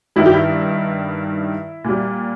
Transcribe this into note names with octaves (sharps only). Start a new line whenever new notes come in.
G2 D#3 G3 E4
G4
E4
A#2 G3